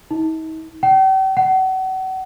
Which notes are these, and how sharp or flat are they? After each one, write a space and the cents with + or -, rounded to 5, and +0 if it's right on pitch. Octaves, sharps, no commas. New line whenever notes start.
D#4 +45
G5 -40
F#5 +35